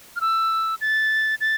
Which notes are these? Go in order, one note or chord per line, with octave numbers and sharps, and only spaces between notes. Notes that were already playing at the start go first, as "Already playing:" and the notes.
F6
E6
A6
A6